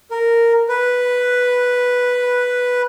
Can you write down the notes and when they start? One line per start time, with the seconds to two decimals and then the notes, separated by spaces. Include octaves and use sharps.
0.11 A#4
0.69 B4